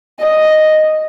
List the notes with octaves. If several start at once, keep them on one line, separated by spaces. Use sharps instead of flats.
D#5